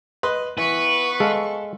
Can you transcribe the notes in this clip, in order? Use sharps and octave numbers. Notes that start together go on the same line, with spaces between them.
B4 D#5 C6
E3 B3 B4 C#6
G#3 A4 F5